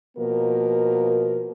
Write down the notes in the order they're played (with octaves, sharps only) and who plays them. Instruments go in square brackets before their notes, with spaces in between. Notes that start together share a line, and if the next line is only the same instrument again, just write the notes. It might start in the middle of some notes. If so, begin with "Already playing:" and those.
[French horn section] B2 F3 A#3 A#4